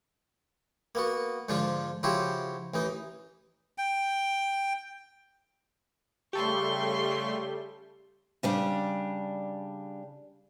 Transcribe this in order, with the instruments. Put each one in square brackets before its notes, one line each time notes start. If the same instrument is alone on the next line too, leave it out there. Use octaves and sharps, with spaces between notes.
[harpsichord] A#3 B3 F#4
G#2 D3 F3 D4 F4
C#3 F3 E4 F#4 G4 C5
A1 E3 D#4
[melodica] G5
[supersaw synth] C#3 G3 A3 [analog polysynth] G4 A4 [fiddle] C6 C#6
[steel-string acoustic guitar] C#3 G3 D4